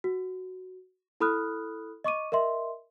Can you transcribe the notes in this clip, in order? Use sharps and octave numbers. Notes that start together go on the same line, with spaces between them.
F#4
E4 A4 B5 D#6 F6 F#6
D#5 C#6 D6 D#7
A#4 D#5 E5 C6